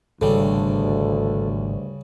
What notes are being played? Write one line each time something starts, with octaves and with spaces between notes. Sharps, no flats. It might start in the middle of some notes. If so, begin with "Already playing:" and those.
G#1 D2 G2 C#3 G3 A4